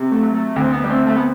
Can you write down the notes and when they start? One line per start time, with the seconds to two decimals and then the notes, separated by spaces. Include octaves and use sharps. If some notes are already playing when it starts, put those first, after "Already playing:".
Already playing: C3
0.11 A3
0.23 F#3
0.34 A3
0.56 D2 C4
0.72 B3
0.84 G3
0.89 A3 C4
1.07 A3
1.16 B3